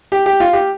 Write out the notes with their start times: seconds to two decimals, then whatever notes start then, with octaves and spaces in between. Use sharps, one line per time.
0.12 G4
0.26 G4
0.40 F4
0.53 G4